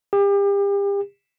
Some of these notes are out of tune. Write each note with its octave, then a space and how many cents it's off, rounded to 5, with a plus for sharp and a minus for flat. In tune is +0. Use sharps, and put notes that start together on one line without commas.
G4 +35